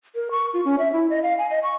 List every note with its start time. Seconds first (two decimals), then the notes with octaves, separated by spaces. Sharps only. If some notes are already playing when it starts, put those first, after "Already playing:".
0.15 A#4
0.31 C#6
0.54 F4
0.65 C#4
0.79 E5
0.93 E4
1.10 D#5
1.23 F5
1.38 G#5
1.50 D#5
1.63 C#6